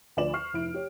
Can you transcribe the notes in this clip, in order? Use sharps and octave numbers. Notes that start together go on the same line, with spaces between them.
D2 F3 B4 D5 E7 F#7
C#6 F6 C7
F1 E4 D7
G4 C#5